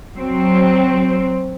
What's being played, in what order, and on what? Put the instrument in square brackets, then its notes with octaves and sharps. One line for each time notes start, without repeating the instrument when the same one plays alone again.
[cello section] F#3 C4